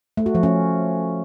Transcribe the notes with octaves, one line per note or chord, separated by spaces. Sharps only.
A3
F#4
F3
C#4